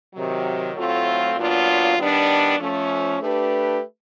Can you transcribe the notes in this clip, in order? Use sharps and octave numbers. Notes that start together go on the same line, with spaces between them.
C3 D#3 F#3
A2 F#3 A3 C4 F4
A#2 F#3 B3 D4 F4
D#3 G3 B3 D4
F3 A3 C#4
A3 D4 G4 B4